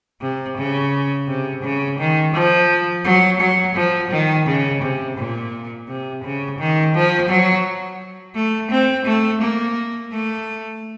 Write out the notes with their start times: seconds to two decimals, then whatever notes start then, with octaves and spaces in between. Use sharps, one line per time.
0.22 C3
0.58 C#3
1.28 C3
1.63 C#3
1.99 D#3
2.34 F3
3.04 F#3
3.40 F#3
3.75 F3
4.11 D#3
4.47 C#3
4.82 C3
5.17 A#2
5.88 C3
6.23 C#3
6.58 D#3
6.95 F3
7.29 F#3
8.35 A3
8.71 C4
9.06 A3
9.41 A#3
10.12 A3